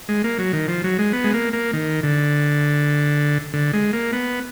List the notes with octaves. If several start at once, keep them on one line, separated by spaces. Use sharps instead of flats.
G#3
A#3
F#3
D#3
F3
F#3
G#3
B3
G#3
A#3
A#3
D#3
D3
D3
G#3
A#3
B3